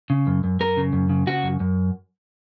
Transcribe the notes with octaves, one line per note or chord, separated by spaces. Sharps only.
C#3
F#2
F#2
F#2 A#4
C#3
F#2
C#3
C#3 F#4
F#2
F#2